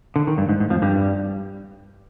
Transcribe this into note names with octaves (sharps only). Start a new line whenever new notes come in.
D3
D#3
G2
G#2
G#2
F2 F3
G2 G3